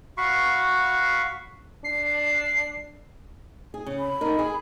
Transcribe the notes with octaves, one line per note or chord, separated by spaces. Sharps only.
F#4 F5 B5 C#6
D4 C7
G#4
C#3
B5
D#4 A#4
G#4